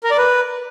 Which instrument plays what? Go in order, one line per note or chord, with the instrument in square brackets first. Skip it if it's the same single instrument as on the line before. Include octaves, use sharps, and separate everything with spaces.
[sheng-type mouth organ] A#4
D5
B4